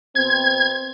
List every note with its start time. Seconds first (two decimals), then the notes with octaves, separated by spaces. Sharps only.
0.15 B2 C4 G#6